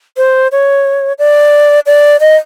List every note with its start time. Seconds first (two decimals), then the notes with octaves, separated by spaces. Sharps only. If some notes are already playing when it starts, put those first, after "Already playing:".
0.17 C5
0.52 C#5
1.19 D5
1.86 D5
2.20 D#5